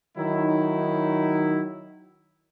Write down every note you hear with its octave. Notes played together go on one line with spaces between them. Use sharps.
D#3 F#3 D#4 E4